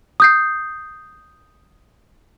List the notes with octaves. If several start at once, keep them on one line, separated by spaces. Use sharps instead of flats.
D#6 G6 C7